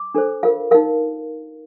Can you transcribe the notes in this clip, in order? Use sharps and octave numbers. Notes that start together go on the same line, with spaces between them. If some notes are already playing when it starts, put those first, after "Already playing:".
Already playing: D6
D4 A4 C5
F4 A#4 F5
D#4 A#4 F5